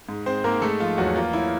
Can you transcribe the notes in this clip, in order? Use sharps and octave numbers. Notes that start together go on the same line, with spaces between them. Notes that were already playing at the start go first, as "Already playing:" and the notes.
G#2
G#3 C4 C5
G#2 A#3 A#4
G#3 A3 A4
F3 F4
E2 F#3 F#4
A#3 F4
F#3 E4